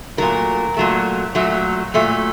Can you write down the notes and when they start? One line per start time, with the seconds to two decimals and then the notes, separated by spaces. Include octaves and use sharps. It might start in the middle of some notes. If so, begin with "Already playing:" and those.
0.17 A#2 F#3 A3 A#4
0.77 A#2 F#3 A3
1.35 A#2 F#3 A3
1.94 A#2 F#3 A3